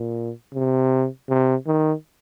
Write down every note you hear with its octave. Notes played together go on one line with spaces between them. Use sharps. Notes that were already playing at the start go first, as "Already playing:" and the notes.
Already playing: A#2
C3
C3
D#3